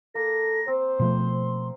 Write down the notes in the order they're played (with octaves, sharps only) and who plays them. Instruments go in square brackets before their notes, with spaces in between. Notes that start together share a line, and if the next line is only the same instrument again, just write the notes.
[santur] A#3 [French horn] A4 [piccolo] A#6
[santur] C4 [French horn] C5
[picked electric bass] B2 F3 A3 [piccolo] C6